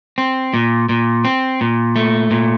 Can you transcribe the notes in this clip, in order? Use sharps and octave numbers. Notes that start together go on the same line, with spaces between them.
C4
A#2
A#2
C4
A#2
A3
A#2